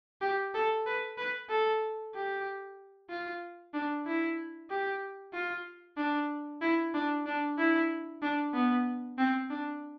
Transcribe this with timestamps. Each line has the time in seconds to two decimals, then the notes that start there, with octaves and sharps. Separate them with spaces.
0.21 G4
0.54 A4
0.86 B4
1.18 B4
1.49 A4
2.14 G4
3.10 F4
3.74 D4
4.06 E4
4.70 G4
5.33 F4
5.97 D4
6.61 E4
6.94 D4
7.26 D4
7.58 E4
8.22 D4
8.53 B3
9.18 C4
9.50 D4